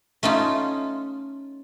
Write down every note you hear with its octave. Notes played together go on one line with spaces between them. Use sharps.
A3 C#4 D#4 F4